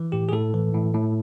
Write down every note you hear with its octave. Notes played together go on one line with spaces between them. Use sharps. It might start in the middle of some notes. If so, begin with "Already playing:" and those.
Already playing: E3
A2 G4
G#4
A2 A4
E3
A2
A2